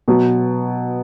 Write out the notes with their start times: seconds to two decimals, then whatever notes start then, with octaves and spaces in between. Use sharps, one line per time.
0.08 B2 F#3 B3